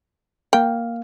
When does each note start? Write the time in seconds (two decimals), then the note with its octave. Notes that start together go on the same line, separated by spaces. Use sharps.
0.53 A#3 F5 G5